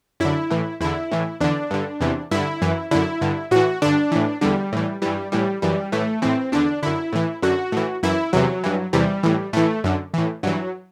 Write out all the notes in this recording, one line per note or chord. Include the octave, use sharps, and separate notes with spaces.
F#2 D3 E4
A2 E3
E2 D3 E4
A2 E3
E2 D3 D4
G2 D3
E2 C3 E3
G2 D3 E4
F#2 E3
F#2 D3 E4
G2 D3
A2 E3 F#4
G2 D3 D4
A2 E3
E2 D3 G3
A2 E3
G2 E3 G3
A2 E3 G3
F#2 E3 G3
A2 E3 A3
A2 E3 C4
E2 D3 D4
F#2 D3 E4
A2 E3
F#2 D3 F#4
A2 E3
F#2 E3 E4
E2 C3 E3 F#3
G2 E3
E2 C3 E3 G3
A2 E3
A2 E3 A3
F#2 D3
A2 E3
G2 E3 F#3